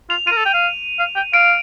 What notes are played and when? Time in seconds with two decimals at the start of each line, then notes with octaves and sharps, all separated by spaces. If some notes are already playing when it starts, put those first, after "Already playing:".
0.10 F4 F7
0.27 F4 A#4 D#7
0.37 A4
0.45 G5
0.54 F5
0.99 F5
1.16 G5
1.34 F5 D7